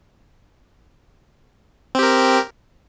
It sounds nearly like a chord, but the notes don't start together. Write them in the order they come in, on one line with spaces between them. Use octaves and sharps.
C4 G4 A#4